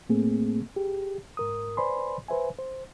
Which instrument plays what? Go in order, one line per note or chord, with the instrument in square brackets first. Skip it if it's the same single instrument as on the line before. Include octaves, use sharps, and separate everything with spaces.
[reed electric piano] A2 A3 A#3 C4 G#4
G4 G#4
G#2 A#4 D#6
B4 C5 D5 G#5 B5 C6
B4 C5 E5 G#5
C5